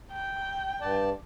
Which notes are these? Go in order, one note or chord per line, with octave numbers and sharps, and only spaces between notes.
G5
G2 D5 A5